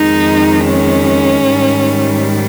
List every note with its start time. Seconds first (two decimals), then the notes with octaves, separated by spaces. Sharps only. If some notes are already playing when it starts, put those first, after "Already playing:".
Already playing: F2 D#3 G#3 D#4
0.65 C#4
1.50 G#2 D#3 G3